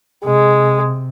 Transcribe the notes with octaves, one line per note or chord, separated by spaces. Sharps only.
C3 G#3